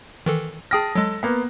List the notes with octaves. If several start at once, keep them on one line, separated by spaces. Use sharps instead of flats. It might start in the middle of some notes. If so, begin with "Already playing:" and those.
D#3 E3 A4
G#4 G5 A5 D#6 F6 A#6
F#3 G#3 A4
A#3 B3